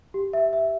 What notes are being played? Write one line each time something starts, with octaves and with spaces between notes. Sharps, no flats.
G4
E5
E5